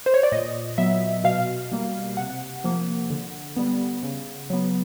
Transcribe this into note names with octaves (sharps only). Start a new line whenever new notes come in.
C5
C#5
D5
A#2 D#5
F#3 B3 E5
B2 F5
G3 A#3
C3 F#5
F3 A#3
D3
G3 B3
C#3
F#3 B3